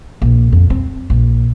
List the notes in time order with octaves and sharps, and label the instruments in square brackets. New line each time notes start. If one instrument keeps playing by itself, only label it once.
[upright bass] A#1
F2
C4
A#1